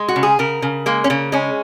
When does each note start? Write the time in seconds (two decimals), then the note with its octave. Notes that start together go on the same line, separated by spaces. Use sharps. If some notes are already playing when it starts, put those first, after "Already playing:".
Already playing: G#3
0.08 F#4
0.16 C#3
0.23 G#4
0.39 C#3 A#4
0.62 C#3
0.86 G#3 A#3
1.04 C#4
1.10 C#3 A#3
1.32 G#3 C#4